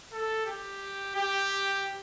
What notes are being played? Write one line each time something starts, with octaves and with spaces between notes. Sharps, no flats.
A4
G4
G4